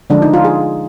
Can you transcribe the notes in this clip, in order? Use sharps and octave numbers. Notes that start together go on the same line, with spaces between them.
D3 F3 G#3 D4
D#4
F4
G#4